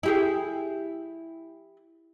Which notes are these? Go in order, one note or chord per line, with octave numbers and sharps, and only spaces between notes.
E4 G4 G#4